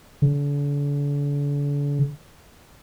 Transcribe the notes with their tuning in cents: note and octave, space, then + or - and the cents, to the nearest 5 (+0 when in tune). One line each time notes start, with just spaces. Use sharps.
D3 -40